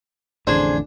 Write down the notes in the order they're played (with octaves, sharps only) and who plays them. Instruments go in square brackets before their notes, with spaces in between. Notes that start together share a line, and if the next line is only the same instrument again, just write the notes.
[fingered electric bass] A1 F2 D3 [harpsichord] D4 [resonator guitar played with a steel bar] G#4 C5